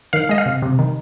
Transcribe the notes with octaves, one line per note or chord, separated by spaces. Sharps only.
D#3 F5
G#3 D#5
F5
C3
C3
D#3